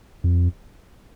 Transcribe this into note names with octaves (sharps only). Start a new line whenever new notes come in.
F2